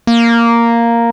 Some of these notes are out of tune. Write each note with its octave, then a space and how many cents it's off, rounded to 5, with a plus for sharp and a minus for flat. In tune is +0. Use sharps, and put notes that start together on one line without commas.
A#3 +0